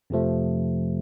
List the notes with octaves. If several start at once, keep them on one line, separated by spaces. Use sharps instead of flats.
F2 C3 F3 A3